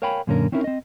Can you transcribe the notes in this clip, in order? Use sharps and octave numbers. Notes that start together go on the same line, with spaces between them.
A#4 C#5 F5 G5 G#5 B5
F#2 A#2 D3 C#4 A#4
C4 C#4 D#4 E4 F#4 A#4
C4 D#5